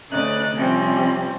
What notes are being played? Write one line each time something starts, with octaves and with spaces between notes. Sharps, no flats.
D2 C#3 D#4 D5 F#6
C3 F3 G3 C4 C#4